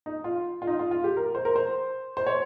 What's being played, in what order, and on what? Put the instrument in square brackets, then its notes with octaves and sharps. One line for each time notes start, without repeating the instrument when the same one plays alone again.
[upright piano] D#4
F4
F4
D#4
F4
F4
G4
A#4
C5
A#4
C5
C5
C#5